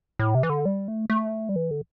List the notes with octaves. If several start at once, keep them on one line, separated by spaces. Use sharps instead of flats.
A2
C3
E3
D3
G3
A3
A3
G3
E3
D3